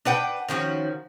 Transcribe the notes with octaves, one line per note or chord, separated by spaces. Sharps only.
D4 B4 F#5 G5
D#3 F3 C#4 F#4